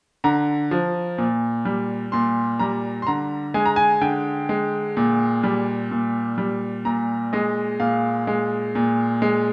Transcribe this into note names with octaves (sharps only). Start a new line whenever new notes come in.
D3 A#5
F3
A#2
G3
A#2 C6
G3 A#5
C6
D3 A#5
G#3 G#5
A#5
G#5
D3 G5
G#3
A#2
G3
A#2
G3
A#2 A#5
G#3 D#5
A#2 F5
G#3
A#2
G#3